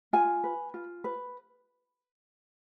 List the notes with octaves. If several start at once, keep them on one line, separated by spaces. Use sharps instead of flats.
F4 G#5
B4
F4
B4